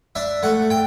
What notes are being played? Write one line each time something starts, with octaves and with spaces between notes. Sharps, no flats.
D4 E5
A3 F#5
G5